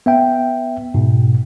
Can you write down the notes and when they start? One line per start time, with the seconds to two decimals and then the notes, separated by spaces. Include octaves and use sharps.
0.06 B3 E5 G5
0.94 G#2 B2